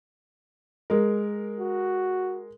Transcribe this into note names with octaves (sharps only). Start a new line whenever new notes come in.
G#3 A#4
F#4